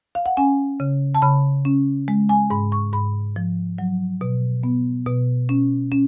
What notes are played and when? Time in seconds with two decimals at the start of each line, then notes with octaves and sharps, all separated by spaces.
0.15 F5
0.26 F#5
0.37 C#4 G#5
0.80 C#3
1.15 A5
1.22 C#3 B5
1.65 C#4
2.08 G#3
2.29 G#5
2.50 G#2 B5
2.72 C#6
2.93 G#2 B5
3.36 F3
3.78 F#3
4.21 B2
4.63 B3
5.06 B2
5.49 C#4
5.92 C#4